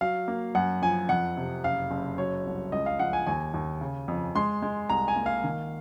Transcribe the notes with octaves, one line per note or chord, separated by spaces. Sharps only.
F#3 F5
A#3
F#2 F#5
F3 G#5
F2 F#5
C3
F#1 F5
F#1
F#3 C#5
C2
C#2 D#5
F5
F3 F#5
G#5
D#2 G#5
D#2
C#3
F2
G#3 C6
G#3
C2 A#5
G#5
A#3
F5
D#3